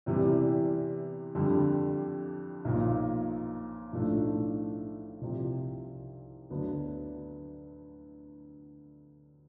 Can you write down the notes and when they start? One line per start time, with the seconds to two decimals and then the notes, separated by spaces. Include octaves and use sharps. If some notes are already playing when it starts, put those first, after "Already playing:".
0.06 E2 C3 E3 G3
1.35 F2 D3 G3
2.65 B1 A#2 F3
3.93 B1 A2 F3 A3 D4
5.21 C2 C3 F3
6.50 D2 D3 F#3 B3 D4